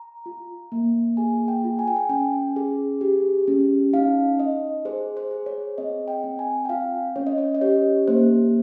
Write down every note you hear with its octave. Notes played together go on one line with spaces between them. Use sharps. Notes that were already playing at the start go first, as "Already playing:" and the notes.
Already playing: A#5
F4
A#3
G#4 G#5
G5
F4
G#5
G5
G#5
C#4 G5
G#4
G4
C#4
D#4 F5
D#4 D#5
G#4 C5
C5
G#4
C#5
C4 D#5
G5
C4
G#5
G5
F4 F5
C#4 C#5
D#5
C#5
D#5
G4 C#5
A#3 C5